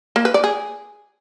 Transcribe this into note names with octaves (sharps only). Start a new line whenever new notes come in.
A#3
B4
D5
G#4